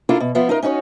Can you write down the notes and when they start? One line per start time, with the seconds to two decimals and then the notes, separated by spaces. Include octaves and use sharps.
0.09 D4 E4 F4 A4 A#4
0.20 B2
0.35 F3 B3 F4 E5
0.49 D#4 F4 A#4
0.63 C#4 D#4 F#4 B4 C#5